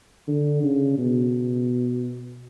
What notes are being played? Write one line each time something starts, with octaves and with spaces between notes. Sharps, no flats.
D3
C#3
B2